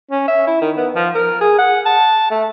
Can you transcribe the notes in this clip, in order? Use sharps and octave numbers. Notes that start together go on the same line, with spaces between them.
C#4
E5
E4
D#3
B3
F3
A#4
G#4
F#5
A5
A3